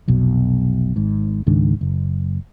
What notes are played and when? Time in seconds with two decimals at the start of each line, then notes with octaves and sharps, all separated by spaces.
0.08 F1 B1 B2
0.96 G#1 G#2
1.47 C#2 G#2 D#3 D4
1.81 F#1